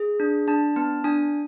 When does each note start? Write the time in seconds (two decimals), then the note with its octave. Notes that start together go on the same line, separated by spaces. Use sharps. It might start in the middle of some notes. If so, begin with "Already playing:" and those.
Already playing: G#4
0.20 D4
0.47 D4 A5
0.76 B3 A5
1.04 D4 G#5